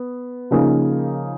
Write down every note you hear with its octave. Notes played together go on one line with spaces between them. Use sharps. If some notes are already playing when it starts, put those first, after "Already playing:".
Already playing: B3
C#3 F3 A#3 D#4 G#4